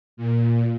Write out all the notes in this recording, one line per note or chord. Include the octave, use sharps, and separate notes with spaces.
A#2